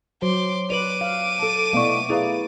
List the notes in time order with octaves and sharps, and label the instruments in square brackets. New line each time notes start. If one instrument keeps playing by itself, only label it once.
[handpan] F#3 C5 [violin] C6 D6
[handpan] B4 D5 [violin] D6 D#7 [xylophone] F7 F#7
[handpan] F5
[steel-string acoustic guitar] A4 A5
[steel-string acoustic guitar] B2 D4 E4 [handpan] A3 B3 [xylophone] F5 C#6
[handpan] E4 [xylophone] G#4 B4 F5 [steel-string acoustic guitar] D5 A#5